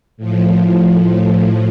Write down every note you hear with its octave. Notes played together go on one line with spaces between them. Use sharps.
A2 F3